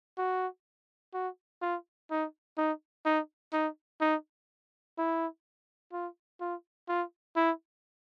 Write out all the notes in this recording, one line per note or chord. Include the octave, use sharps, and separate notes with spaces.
F#4
F#4
F4
D#4
D#4
D#4
D#4
D#4
E4
F4
F4
F4
E4